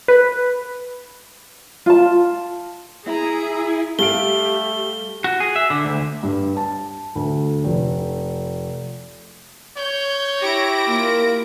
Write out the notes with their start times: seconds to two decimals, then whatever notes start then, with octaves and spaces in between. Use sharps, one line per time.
0.08 B4
1.86 F4 A5
3.08 E4 G#4 A#5
3.99 G3 A3 G4 F5 D7 G7
5.24 F#4
5.40 G#4
5.56 E5
5.70 D3
5.85 D2
6.23 G2
6.57 A5
7.15 D2
7.64 F1
9.77 C#5 G6
10.42 E4 G4 A#6 D7
10.87 A#3 F4